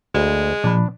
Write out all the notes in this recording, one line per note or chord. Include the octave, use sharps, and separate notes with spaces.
D2 G#3
A#2 F3 D4 B5